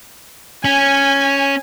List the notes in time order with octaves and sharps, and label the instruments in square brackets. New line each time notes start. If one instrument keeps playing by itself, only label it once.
[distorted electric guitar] C#4 [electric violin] G#5